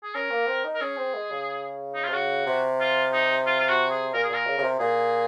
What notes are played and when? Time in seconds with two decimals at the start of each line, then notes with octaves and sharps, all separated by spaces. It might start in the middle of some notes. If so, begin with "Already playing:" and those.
0.04 G#4
0.15 C#4 A#4
0.31 A#3
0.47 C4
0.64 D#4
0.75 A#4
0.81 C#4 G#4
0.97 C4
1.15 G#3
1.31 C#3
1.95 D#4
2.04 F4
2.09 C3
2.13 C#3 F#4
2.46 C3
2.80 F4
3.13 D#4
3.46 F4
3.60 F4
3.69 F#4
3.91 G#4
4.13 A#2 A#4
4.24 G#4
4.30 A#2 A#4
4.47 C#3
4.58 C#3
4.63 C3
4.79 A#2 G#4